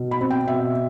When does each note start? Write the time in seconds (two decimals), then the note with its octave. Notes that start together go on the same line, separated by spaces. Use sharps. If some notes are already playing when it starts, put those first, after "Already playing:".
Already playing: B2
0.11 B5
0.21 C4
0.30 G5
0.48 B2 E5